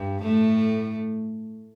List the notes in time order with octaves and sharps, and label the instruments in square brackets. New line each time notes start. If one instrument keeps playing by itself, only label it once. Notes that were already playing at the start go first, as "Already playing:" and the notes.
Already playing: [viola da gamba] G2
A2 A3